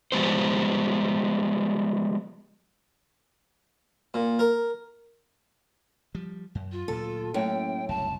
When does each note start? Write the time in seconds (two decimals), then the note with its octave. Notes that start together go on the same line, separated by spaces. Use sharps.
0.12 F3 G3 G#3 B3 C5
4.14 A#2
4.39 A#4
6.15 F3 G3
6.55 F#2
6.72 F4
6.88 D2 A#2 F#3 A4
7.34 F#2 A2 A#3 C#4 G5
7.89 F#1 C2 A5